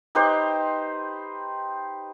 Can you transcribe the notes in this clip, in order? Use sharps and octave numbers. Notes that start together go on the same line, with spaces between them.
D#4 G4 B4 C5